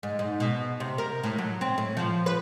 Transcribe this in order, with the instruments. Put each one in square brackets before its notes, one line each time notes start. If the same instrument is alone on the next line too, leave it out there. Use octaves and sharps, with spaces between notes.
[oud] G#2
G#2
B2
C3
A#4
A2
F#3
C4
A2
F3
B4